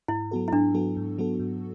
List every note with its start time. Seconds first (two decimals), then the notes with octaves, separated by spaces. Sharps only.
0.08 G#2 E4
0.31 F#3 B3 F#4 A4
0.48 E4
0.52 G#2 D4
0.74 F#3 B3 F#4 A4
0.97 G#2
1.18 F#3 B3 F#4 A4
1.39 G#2